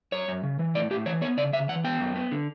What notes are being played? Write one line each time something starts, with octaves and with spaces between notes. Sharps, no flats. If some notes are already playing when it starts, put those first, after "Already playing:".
F#2 C#5
F#2
C#3
E3
A2 D5
A2 G4
E3 C#5
B3 C#5
C#3 D5
C#3 E5
E3 F#5
B3 G5
F#2
B3
D3